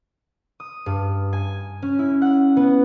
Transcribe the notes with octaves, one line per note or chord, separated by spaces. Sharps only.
D#6
G2
G#5
C#4
E4
F#5
B3